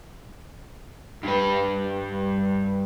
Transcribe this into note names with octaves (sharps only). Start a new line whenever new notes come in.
G2 B4